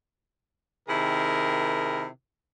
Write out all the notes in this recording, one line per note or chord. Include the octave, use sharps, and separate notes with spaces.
C3 D#3 E4 G#4 A#4